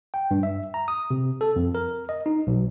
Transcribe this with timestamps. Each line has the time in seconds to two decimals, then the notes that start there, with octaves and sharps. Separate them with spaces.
0.14 G5
0.31 G2
0.43 E5
0.74 A#5
0.88 D#6
1.10 C3
1.41 A4
1.56 F2
1.75 A#4
2.09 D#5
2.26 D#4
2.47 B1